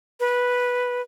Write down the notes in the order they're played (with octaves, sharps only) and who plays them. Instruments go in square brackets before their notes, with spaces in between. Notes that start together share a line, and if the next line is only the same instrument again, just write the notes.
[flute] B4